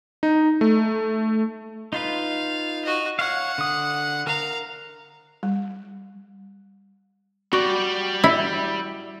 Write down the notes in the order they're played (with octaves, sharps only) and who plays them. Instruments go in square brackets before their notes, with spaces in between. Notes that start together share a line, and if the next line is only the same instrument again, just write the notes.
[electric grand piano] D#4
A3
[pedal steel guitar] D#4 F4 B4 [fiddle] F5
[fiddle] F#4 D#5
[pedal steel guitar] C#5 F5 [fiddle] F#5
[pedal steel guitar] D3 D#6
[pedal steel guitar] A#4 [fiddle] F5 A#5
[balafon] G3
[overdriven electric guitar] G3 D5 [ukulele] F#4
[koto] E4